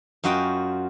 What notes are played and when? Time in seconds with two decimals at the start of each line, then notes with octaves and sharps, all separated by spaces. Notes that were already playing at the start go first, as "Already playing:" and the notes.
0.24 F#2 F4 F#4 D#5 G5